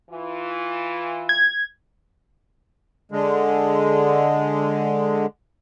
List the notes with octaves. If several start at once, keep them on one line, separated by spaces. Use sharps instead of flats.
E3 F4
G#6
D3 G#3